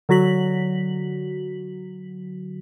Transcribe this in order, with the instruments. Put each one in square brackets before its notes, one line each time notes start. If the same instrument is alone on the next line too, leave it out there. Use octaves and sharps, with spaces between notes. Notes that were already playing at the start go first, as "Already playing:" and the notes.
[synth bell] D3 F#3 F#4 B6 F#7